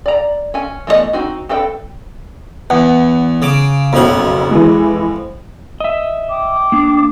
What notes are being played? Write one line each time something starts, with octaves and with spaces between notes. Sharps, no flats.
D5 A#5
C#4 G#5
E3 A3 B3 E4 D#5
C4 D#4 F#4
C4 A4 B4 G5
E2 F#5
C#3 D6
F#1 B1 F2 F3 F#5
E3 G#3
D#5 E5
G5 D6 D#6
A#3 D4